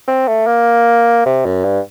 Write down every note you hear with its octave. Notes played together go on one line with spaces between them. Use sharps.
C4
A3
A#3
C3
F#2
G2